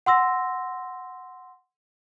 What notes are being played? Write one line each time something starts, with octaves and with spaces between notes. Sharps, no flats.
F#5 C6 E6 A#6